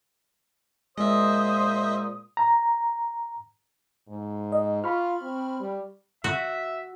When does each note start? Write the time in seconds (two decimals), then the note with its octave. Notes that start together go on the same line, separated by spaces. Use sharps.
0.98 A#2 G#3 C5 D#5 E5 D#6
2.37 A#5
4.08 G#2
4.52 D#5
4.84 F4 B5 C#6 F6
5.22 C4
5.60 G3
6.24 F#4 E5